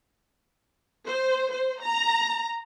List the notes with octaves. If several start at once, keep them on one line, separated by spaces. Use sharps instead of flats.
C5
C5
A#5